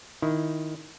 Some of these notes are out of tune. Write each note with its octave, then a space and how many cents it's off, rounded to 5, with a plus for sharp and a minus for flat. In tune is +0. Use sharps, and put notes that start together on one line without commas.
D#3 +0 E4 +0